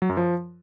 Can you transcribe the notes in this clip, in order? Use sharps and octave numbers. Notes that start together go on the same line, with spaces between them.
F#3
F#2
F3